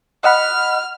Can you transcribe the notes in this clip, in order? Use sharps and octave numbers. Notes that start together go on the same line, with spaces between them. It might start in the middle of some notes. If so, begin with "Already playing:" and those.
D#5 F#5 B5 F6